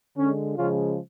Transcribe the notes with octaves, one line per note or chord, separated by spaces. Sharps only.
D3 G#3 C#4
C#3 F3 G#3 C#4 F4